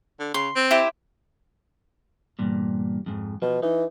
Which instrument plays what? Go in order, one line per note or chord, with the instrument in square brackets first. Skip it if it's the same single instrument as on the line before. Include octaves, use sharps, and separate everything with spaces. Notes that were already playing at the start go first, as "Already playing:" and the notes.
[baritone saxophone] D3
[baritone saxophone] C#3 [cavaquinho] C6
[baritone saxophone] C4
[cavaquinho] E4 G4 C5
[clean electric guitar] E2 G2 A#2
F2 G#2
[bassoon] B2 [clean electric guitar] F3
[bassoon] E3 [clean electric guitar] D#4